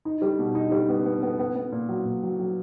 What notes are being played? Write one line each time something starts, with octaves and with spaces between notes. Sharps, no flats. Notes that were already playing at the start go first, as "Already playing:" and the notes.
D#4
G3
B2
D#4
G3
B3
B3
B3
B3
B3
A#2
F#3
A#2
F#3
F#3